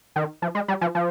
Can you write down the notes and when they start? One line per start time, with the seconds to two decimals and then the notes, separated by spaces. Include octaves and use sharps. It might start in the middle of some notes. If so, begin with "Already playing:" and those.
0.16 D#3
0.42 F3
0.55 G#3
0.68 G3
0.81 F3
0.95 F3